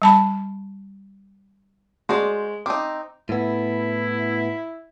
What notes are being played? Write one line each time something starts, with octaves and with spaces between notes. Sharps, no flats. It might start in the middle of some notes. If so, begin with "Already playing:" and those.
G3 A5 B5
G#3 F#4 C5 D5
C4 D#4 D6
A2 B3 E4